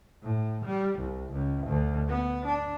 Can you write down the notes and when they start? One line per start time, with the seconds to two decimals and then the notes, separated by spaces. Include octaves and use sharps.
0.23 A2
0.65 G3
0.99 C2
1.32 C#2
1.67 D2
2.09 B3
2.46 D4